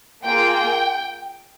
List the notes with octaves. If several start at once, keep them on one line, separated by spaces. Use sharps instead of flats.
A#3 F4 G#4 G5